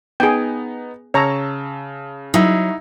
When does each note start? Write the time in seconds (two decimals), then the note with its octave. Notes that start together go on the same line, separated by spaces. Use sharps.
0.20 B3 D#4 G#4 G5
1.14 C#3 C#5 A5 A#5 E6
2.34 F#3 D#4 E4